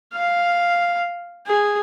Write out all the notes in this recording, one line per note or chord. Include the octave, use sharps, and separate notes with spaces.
F5
G#4